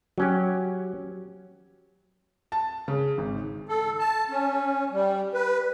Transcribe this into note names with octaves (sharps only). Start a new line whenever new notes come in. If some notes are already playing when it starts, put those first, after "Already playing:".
F#3 C#4 G4
A5
C#3
G#1
A4
A5
C#4
G3
B4